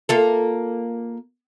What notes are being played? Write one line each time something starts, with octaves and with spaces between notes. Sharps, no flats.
A#3 F4 A4